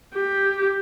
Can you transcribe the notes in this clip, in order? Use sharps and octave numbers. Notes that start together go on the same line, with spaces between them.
G4